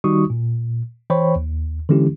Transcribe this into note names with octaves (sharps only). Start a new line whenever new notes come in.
D#3 G3 D#4 F#4 C#6 D#6
A#2
E3 C5 C#5 G5 B5 C#6
D#2
D3 E3 G#3 C#4 E4 G4